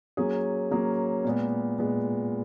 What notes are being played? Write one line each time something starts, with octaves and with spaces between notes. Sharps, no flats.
F#3 A#3 C#4 G#4
F#3 A#3 C#4 G#4
A#2 G#3 B3
A#2 G#3 B3